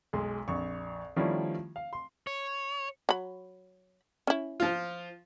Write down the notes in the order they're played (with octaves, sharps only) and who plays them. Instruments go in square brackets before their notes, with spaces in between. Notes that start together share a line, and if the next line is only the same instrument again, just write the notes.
[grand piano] B1 G#3 C6
A#1 F2 C#6
D#3 F3 G3 A3 C#4 E4
F5
C6
[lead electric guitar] C#5
[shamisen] F#3 B5
C#4 E4
[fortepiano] F3 F4